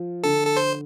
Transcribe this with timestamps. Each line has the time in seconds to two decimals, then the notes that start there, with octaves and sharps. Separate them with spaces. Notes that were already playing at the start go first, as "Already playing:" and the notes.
Already playing: F3
0.24 D3 A4
0.47 A4
0.57 C5